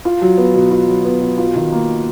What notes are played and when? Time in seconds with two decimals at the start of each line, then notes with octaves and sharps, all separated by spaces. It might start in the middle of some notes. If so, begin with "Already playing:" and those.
0.05 F4
0.21 F#3
0.38 B3
0.54 B2
0.71 F4
0.88 F#3
1.05 B3
1.21 B2
1.38 F4
1.56 D#3
1.72 A#3